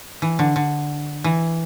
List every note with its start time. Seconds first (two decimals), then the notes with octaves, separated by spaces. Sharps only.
0.22 E3
0.39 D3
0.56 D3
1.24 E3